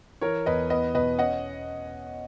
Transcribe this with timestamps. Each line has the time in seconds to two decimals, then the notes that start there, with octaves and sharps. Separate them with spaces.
0.21 E3 A#4 C#5
0.46 E2 B4 D#5
0.70 B3 B4 D#5
0.95 B2 B4 D#5
1.18 C#4 D#5 F#5